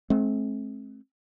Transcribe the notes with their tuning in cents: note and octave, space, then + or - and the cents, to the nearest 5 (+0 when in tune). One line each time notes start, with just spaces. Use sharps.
A3 -45 C4 +30